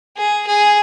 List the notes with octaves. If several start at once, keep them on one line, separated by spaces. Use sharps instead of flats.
G#4
G#4